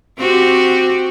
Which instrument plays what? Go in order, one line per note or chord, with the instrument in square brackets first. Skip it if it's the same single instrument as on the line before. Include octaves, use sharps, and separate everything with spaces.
[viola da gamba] C4 F#4 G4